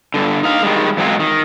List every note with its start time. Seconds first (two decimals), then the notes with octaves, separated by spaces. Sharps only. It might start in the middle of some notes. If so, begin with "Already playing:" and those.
0.14 G2 D3
0.43 D#4 F5
0.62 D#3 G3 G#3
0.97 E2 G#2 F#3 G#3 C4 F4
1.20 D#3